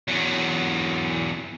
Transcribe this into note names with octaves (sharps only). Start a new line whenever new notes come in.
E2 F#3